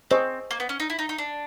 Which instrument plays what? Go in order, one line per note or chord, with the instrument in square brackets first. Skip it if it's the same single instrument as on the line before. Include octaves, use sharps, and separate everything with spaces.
[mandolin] C4 [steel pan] C5 D#5 G#5 C#6
[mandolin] A#3
B3
C#4
D#4
E4
D#4
D#4
D4